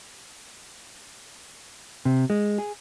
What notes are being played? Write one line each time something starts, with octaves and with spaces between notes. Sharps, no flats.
C3
G#3
G#4